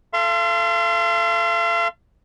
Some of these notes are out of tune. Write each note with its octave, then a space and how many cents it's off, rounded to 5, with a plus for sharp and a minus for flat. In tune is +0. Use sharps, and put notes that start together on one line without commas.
A4 +0 F5 -40 C6 +0